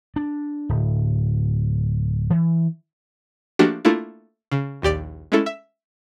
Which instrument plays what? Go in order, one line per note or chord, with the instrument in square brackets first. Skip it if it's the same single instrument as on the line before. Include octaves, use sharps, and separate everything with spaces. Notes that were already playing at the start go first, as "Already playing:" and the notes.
[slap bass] D4
D1
E3
[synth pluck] F3 A3 A#3 D4 F#4 G4
A3 A#3 D4 E4 F4
C#3
A#1 D#2 G4 D5 D6
G#3 A3 C#4 E4 A4
E5